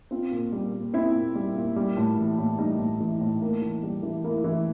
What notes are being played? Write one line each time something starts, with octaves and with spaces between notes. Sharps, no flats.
C4 F4
A#2
G3
A#2
C4 E4
A#2
G3
A#2
G3
A2
E3
A2
G3 D#4
A2
E3
A2
A#3
E3
G3
E3
A#3 E4
E3